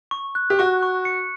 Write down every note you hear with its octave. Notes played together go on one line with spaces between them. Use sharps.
C#6
F#6
G4
F#4 C#6
C#6
C#7